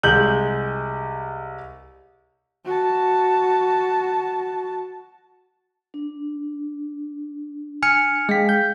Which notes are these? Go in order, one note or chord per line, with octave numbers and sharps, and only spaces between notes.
C2 G#3 G6 F#7
F#4 A5
D4
G#5 F6 C#7
G#3 G#4 F5 G5 B6
G6